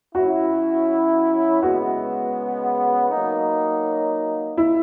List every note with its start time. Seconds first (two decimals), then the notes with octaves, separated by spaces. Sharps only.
0.15 F#3 C#4 E4 F#4
1.62 C#3 G#3 B3 F#4
3.10 F#3 A#3 D#4
4.57 E4